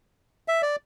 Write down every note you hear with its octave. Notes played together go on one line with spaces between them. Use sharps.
E5
D5